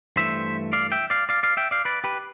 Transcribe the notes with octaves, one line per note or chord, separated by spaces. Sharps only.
G2 E3 A3 C5 E5
D5 F5
E5 G5
D5 F5
D5 F5
D5 F5
E5 G5
D5 F5
B4 D5
G4 B4